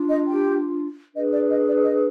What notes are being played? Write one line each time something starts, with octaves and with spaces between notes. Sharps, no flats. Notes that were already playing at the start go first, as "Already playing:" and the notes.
Already playing: D4 F4
D#5
G4 G5
D4 G#4 B4 D#5
D5
D#5
D5
D#5